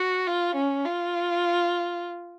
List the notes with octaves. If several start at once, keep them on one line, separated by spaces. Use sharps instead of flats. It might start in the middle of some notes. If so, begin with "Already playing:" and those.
Already playing: F#4
F4
C#4
F4